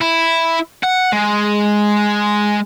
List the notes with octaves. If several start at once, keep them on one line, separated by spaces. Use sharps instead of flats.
E4
F#5
G#3